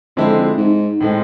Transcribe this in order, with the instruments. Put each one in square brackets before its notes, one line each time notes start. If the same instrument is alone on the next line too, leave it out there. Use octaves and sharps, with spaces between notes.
[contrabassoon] F2 [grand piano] D3 G#3 C4 E4
[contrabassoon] G#2
[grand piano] A2 G#3 C4